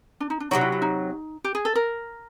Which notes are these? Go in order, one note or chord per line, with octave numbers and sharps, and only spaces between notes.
D4
D#4
D4
C3 D#3 F#3 D#4
E4
E4
D#4
G4
G#4
A4
A#4